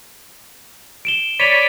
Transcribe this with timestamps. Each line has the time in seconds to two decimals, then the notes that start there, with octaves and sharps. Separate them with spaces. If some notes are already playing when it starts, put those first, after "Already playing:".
1.05 D7 E7 G7
1.40 C#5 D5 B5 D#7 F7